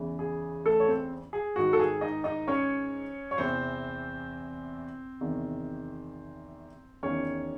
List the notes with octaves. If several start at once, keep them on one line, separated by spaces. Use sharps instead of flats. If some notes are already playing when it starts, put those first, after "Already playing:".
Already playing: E2 C#3 E3
G#4
A3 A4
C#5
C4 C5
G#4
G#2 D#3 F#4
A4
G#4
D#4 D#5
D#4 D#5
C#4 C#5
C#5
E2 C3 E3 C4 C5
E2 C3 D#3
E2 D#3 C#4 C#5